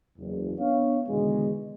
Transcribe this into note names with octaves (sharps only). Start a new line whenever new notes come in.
F#1 E2
B3 D4 C#5 F5
E2 B2 D3 D#3 G#3